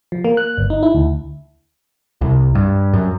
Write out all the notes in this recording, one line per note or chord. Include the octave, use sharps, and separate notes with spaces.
F3
A#3
F#6
G1
D#4
E4
D2
C2
G2
F#2